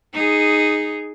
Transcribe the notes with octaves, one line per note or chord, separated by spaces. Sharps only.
D#4 G#4